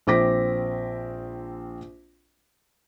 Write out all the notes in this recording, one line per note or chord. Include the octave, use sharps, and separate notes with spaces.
A#1 C4 D6 A#6 B6